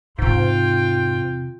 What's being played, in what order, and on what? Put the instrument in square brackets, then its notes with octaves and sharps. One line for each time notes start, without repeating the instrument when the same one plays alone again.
[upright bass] E2 C3 [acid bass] G#2 [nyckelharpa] F4 G5